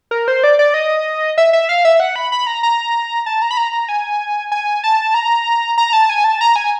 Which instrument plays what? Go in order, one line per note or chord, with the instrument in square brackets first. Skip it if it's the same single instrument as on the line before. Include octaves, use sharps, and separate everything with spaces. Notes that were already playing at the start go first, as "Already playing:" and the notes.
[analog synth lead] A#4
C5
D5
D5
D#5
E5
E5
F5
E5
F#5
B5
B5
A#5
A#5
A5
A#5
B5
A#5
A#5
G#5
G#5
A5
A#5
A#5
A5
G#5
A5
A#5
G#5